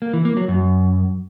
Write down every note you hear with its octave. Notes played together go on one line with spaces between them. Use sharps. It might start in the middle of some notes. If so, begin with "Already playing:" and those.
A#3
E3
A#3
F#3
F#2